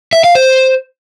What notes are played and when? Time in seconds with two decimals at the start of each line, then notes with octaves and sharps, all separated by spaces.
0.13 E5
0.24 F5
0.35 C5